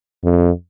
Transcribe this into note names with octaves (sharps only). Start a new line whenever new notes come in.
F2